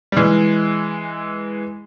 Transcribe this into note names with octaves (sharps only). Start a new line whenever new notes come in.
G3
E3 G#3